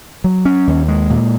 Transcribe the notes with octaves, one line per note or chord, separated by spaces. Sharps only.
F#3
C#4
D#2
G#3
A#2